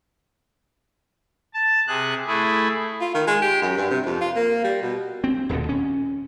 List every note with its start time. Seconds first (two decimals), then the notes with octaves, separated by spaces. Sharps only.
1.54 A5
1.87 C3 G#4 F#6
2.27 A3 E4 G#4
3.01 F4
3.14 D#3
3.27 G#3
3.42 G4
3.62 F#2
3.77 G2
3.90 C3
4.05 F2
4.21 F4
4.36 A#3
4.64 G3
4.82 B2
5.24 C4
5.49 D#1 D#2 B2 D3
5.69 C#4